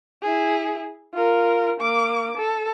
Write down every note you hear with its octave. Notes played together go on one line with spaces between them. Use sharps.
E4 G#4
F4 A#4
A#3 D6
A4